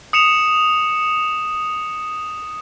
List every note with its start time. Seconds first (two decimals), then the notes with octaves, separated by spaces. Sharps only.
0.13 D#6 C#7 E7 F7